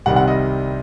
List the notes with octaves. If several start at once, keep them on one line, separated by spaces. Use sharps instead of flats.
C2 C3 D#3 G3 C4 F#5
F#5
D#5